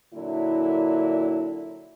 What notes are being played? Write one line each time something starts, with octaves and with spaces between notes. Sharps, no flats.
A#2 D3 F#3 E4